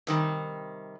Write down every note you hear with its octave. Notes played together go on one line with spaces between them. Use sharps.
C3 D#3 G3